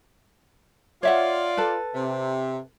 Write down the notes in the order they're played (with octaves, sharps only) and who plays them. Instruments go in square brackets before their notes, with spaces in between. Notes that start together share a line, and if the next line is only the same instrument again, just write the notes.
[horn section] F4 D5 [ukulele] C#5 E5 F#5
[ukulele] A4 B4
[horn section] C3